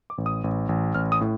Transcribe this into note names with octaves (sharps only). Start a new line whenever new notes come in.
D6
A1
D#6
A1
A1
A1 F6
D#6
A2